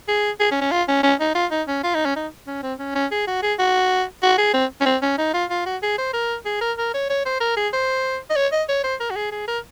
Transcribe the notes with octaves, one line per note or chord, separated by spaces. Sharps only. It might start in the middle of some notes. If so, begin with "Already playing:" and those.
G#4
G#4
C#4
C#4
F4
C#4
C#4
D#4
F4
D#4
C#4
F4
D#4
C#4
D#4
C#4
C4
C#4
C#4
G#4
F#4
G#4
F#4
F#4
G#4
C4
C#4
C4
C#4
D#4
F4
F4
F#4
G#4
C5
A#4
G#4
A#4
A#4
C#5
C#5
C5
A#4
G#4
C5
D#5
C#5
D#5
C#5
C5
A#4
F#4
G#4
G#4
A#4